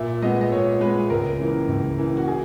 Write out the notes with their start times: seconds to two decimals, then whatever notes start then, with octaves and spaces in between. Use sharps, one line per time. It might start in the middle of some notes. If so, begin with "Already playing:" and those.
Already playing: A#2 E5
0.22 G#3 B3 D#5
0.41 D#5
0.52 A#2 C#5
0.81 G#3 B3 B4
1.10 C#2 A#4
1.39 C#3 E3 A#3
1.69 C#2
1.98 C#3 E3 A#3
2.17 F#4
2.28 G#4